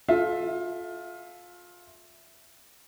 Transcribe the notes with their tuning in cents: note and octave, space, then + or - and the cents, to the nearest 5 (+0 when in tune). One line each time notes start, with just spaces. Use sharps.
F4 +20 A4 -30 E5 +0